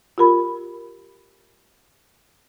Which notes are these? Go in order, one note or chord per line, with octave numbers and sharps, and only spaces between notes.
F4 G4 A#4 B5